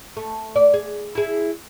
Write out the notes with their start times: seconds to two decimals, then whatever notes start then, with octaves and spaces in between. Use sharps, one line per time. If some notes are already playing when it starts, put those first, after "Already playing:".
0.17 A3
0.56 D5
0.74 G#4
1.15 E4 G#4